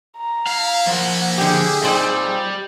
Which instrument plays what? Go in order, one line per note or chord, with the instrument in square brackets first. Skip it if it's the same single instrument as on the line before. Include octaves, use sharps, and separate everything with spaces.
[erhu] A#5
[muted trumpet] E4 [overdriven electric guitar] F5
[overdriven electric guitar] F3 A#4 [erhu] F#5
[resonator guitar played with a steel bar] D3 G4 [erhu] G#4
[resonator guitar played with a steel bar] A#2 C4 D#4 [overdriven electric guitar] G3